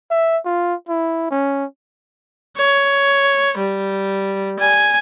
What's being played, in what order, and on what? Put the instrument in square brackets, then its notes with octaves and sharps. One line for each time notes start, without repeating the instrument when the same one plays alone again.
[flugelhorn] E5
F4
E4
C#4
[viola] C#5
G3
G#5